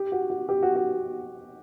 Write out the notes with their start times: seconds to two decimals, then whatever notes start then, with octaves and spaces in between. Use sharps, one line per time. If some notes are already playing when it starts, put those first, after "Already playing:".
Already playing: G4
0.12 F#4
0.30 F#4
0.49 G4
0.63 F#4
0.76 F#4